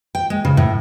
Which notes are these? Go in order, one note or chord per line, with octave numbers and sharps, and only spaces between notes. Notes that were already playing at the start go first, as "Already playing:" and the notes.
G5
G#3
C#3
A2